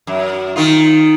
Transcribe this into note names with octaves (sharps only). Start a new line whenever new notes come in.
F#2
D#3 D#4 F4